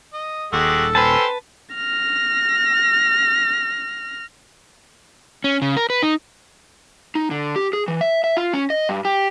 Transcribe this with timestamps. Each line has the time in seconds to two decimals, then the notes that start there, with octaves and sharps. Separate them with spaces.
0.13 D#5
0.53 D#1 G#3 F#4 G4 A4
0.95 C#4 B4 C5 G5 A5
1.75 F6 A#6
5.44 C#4
5.62 C#3
5.77 A#4
5.90 B4
6.03 D#4
7.15 D#4
7.31 D3
7.56 G4
7.73 G#4
7.88 E3
8.01 E5
8.24 E5
8.37 F4
8.53 C#4
8.70 D#5
8.89 G2
9.05 G4